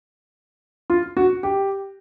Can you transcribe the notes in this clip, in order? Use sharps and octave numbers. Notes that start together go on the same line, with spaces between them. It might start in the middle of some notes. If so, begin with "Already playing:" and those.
F4
F#4
G4